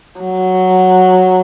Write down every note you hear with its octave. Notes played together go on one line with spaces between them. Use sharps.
F#3